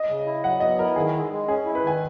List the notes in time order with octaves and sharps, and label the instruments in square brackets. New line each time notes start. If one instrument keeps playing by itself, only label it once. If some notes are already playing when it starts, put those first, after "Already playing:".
Already playing: [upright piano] D#5
[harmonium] C#3
E4
[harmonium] F#3 [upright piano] F#5
[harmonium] B3 [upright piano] D#5
[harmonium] E4 [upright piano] A#4
[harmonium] D#3 [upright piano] G#4
[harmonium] G#3
G#3
[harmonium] C#4 [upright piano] G#4
[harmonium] E4
[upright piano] B4
[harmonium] D#3 [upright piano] G#5